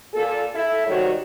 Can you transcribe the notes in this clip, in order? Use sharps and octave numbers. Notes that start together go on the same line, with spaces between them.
A#2 A4
E4 A4
G#2 D#3 G3 F#4 C#5